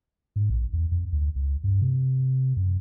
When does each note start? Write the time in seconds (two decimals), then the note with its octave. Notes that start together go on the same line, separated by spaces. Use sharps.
0.36 G#2
0.50 A#1
0.73 E2
0.91 F2
1.12 D2
1.36 C#2
1.64 G2
1.82 C3
2.57 F#2